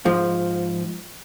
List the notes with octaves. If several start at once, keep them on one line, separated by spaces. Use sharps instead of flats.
G#2 F3